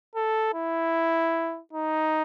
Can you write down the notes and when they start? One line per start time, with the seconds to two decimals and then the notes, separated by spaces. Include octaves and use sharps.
0.15 A4
0.54 E4
1.73 D#4